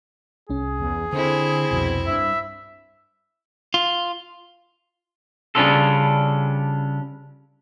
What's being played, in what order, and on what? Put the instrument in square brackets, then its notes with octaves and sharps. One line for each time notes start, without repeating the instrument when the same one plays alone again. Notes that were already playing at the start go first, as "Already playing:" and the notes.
[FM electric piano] C2 C#4 [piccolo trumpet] G#4
[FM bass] E2
[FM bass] D3 [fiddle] C4 E4 [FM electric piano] G#5 D#6
[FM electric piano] C2 F2 G#6 [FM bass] B2
[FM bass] G2 [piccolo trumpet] E5 [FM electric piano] B5
[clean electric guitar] F4
C#3 G3 C#4 D4 F4 A4